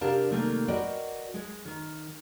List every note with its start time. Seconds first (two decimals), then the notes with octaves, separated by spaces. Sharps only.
0.01 C3 D4 G4 A#4 F5 A5
0.30 C3 D#3 G3 A3 A#3
0.68 F#4 A#4 B4 D5 D#5 G5
1.34 G#3
1.65 D#3